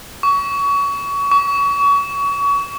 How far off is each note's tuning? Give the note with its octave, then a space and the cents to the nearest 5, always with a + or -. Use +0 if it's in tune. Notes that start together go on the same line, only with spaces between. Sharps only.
C#6 +25
C#6 +30